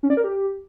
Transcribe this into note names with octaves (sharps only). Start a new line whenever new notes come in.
C#4
D5
A#4
G4